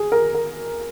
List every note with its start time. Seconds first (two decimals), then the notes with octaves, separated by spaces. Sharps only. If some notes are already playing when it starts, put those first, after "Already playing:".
Already playing: G#4
0.12 A#4
0.35 A#4